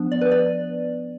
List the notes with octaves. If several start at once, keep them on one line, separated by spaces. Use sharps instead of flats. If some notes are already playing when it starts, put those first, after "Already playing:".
Already playing: F3 B3 D4
D5
B4
D5